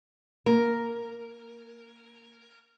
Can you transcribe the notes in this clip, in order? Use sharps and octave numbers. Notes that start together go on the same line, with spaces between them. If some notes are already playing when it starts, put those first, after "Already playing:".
A#3 A#4